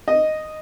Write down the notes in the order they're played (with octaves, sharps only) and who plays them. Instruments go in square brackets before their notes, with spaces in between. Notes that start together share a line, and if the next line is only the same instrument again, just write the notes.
[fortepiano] D#5